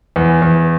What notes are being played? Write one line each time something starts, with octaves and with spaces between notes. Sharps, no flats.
E2
E2